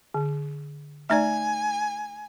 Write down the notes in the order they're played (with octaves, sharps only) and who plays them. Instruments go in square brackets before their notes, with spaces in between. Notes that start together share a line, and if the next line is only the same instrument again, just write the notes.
[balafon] D3
[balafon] A3 D#4 D5 [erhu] G#5